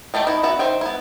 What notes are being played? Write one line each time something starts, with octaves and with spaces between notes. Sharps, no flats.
D#3 A3 D#4 G4
D#4 E4
B3 F#4 E5
D#3 C5 E5 G5
B3 E4